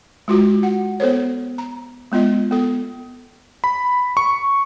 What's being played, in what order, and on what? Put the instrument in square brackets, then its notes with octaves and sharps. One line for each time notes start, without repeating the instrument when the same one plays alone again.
[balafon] G#3 F4 F#4
F#5
B3 A4 C5 C#5
A#5
G#3 B3 F4 D#5
B3 A4
[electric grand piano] B5
C#6